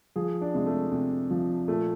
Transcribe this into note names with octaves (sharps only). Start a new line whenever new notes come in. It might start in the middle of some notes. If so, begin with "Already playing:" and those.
F3 G#4
D4
C3 G#3
A3
C3
F3
A#2 A3